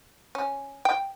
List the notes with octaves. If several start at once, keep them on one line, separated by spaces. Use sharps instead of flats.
C#4
G5